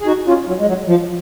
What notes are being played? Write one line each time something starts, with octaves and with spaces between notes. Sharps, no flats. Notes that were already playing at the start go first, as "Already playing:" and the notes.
G#4
D#4 F#4
C#4 F4
F#3
G#3
F#3
F3